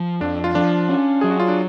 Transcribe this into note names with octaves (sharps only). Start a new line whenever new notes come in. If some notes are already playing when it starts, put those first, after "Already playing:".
Already playing: F3
F2 D4
F4
F3 D4
C#4
F#3 G#4
F#4
F4
D4